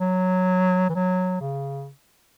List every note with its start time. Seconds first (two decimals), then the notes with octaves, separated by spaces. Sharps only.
0.01 F#3
0.90 E3
0.95 F#3
1.41 C#3